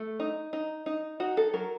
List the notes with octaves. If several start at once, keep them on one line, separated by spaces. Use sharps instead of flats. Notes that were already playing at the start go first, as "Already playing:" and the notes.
Already playing: A3
D#4
D#4
D#4
D#4 F#4
A4
F#3 A#4